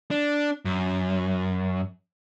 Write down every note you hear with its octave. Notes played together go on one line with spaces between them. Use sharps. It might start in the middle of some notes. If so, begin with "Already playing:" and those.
D4
F#2